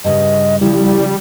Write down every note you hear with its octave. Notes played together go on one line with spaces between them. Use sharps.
G2 C#3 D#5
C#3 F3 G3 E4